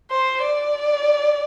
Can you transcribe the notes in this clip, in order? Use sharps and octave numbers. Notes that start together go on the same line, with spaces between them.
C5
D5